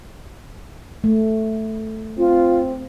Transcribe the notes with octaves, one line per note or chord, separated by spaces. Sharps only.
A3
C4 F4